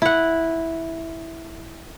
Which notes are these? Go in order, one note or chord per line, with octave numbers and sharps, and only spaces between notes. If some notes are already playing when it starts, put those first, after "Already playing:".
E4 F#5